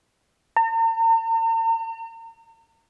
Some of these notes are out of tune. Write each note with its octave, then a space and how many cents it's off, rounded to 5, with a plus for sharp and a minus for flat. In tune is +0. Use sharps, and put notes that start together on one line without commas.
A#5 -45